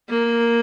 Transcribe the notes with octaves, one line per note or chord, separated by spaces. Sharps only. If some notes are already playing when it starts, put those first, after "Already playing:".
A#3